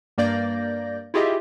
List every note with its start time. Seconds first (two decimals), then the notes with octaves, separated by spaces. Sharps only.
0.18 G2 A#3 D5 G6 A#6
1.14 E4 F4 G4 G#4 D#5 E5